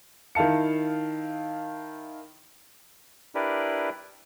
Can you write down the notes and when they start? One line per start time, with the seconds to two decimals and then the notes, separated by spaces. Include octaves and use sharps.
0.35 D#3 E4 F5 A5 C#7
3.35 D4 E4 G4 A#4 B4 D5